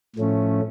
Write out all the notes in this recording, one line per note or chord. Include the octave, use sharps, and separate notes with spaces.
A2 F3 A3 C#4